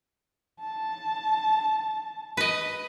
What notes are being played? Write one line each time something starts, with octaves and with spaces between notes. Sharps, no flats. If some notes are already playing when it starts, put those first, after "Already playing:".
A5
B4 D#5